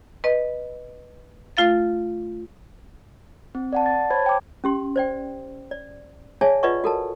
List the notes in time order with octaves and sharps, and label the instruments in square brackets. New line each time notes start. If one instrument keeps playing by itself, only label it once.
[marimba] B4 D#5
A3 F4 F5 A6
[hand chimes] C4
D5 F#5 A5
A6
C5 C#5 A5 B5 G#6
G5 D6
[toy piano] C#4 G4 C6
C5 D5 G5
D5
G#4 C#5 D5 E5 G#5 A5
F4 B4 D5 D#5 F#5 C#6
F#4 A4 A#4 A5